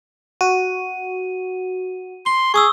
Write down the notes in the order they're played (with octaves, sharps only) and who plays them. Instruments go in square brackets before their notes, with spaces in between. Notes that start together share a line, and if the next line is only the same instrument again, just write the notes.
[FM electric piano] F#4 [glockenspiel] D#7
[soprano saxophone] C6 [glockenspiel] G7
[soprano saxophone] G#4 [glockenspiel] C#6 D#6 E6